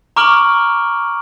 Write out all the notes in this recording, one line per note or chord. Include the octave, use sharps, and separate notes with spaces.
A#5 C#6 D6 F6 D7 F#7